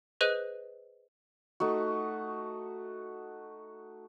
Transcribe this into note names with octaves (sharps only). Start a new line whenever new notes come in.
G#4 B4 C5 D#5 F#6 D#7
A3 D#4 F#4